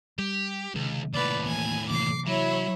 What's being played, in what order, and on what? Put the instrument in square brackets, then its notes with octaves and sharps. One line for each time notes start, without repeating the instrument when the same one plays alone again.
[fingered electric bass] G3 [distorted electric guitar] G4
[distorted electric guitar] C#2 [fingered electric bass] C3 D#3 G#3
[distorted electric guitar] D#2 A2 [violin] B4 D5
[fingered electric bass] E3 A#3 [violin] G#5
[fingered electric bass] C3 E3 A#3 [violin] D6 C7
[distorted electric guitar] F#3 [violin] E4 C#5